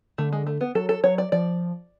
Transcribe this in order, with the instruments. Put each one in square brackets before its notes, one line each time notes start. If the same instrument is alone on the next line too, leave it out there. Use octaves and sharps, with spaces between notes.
[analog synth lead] D3 [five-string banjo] A3
[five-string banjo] G#3
A3
B3
[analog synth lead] F#3 [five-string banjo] A4
[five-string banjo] A4
[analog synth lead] F#3 [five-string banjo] C#5
[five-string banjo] D5
[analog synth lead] F3 [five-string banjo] D5